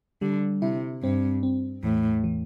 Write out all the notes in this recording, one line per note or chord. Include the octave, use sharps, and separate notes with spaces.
D3 G3
C3 E4
G2 C4
C4
E2 A2
E3